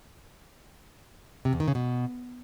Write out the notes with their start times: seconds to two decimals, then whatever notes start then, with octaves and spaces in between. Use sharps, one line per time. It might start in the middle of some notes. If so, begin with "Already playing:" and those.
1.45 C3
1.53 E2
1.60 D#3
1.68 C#3
1.75 B2